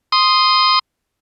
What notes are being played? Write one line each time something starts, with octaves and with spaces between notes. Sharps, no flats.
C6 D#6